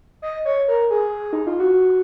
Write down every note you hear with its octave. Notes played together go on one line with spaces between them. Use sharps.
D#5
C#5
A#4
G#4
D#4
F4
F#4